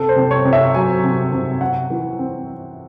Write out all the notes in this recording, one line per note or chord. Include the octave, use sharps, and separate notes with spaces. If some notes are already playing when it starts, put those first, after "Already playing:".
Already playing: C3 A4
C5
C3
C#5
C3
E5
F#3 G#5
C3
C3
C3 F#5
E3
C4